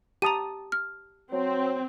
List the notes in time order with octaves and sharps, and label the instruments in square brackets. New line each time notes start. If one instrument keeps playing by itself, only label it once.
[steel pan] G4 A5 D#6 [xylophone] A#5 D#7
[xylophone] F6
[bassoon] F#3 [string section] C4